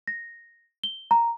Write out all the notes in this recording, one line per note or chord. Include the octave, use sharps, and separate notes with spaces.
A#6
G7
A#5